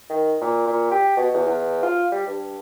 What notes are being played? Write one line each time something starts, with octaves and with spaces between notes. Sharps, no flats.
D#3
A#2
A#2
G4
B2
E2
E2
F4
G3
G2